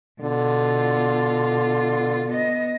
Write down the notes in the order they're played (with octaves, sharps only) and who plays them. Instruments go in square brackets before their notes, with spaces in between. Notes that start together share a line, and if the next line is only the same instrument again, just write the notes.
[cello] B2 F4 [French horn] D3
[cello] B3 D#5